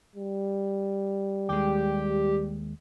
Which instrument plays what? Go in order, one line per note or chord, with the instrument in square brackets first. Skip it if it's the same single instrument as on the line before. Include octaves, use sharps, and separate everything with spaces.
[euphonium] G3
[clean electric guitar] D#2 G#3 [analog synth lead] G4